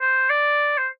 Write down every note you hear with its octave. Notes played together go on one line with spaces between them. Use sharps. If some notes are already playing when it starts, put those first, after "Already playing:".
C5
D5
C5